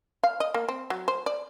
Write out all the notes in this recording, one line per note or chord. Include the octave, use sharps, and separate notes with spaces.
F5
D#5
A#3
C4
F#3
C5
D5